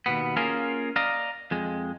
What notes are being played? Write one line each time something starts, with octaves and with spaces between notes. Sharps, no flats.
D#2 B2 B3
A#3 C#4 F4 G#4 A#4 F5
D5 D#5 F5 A#5
F2 G#3